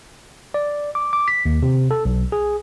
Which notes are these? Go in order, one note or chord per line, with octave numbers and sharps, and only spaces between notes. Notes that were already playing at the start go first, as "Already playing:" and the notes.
D5
D6
D6
B6
D#2
C3
A4
B1
G#4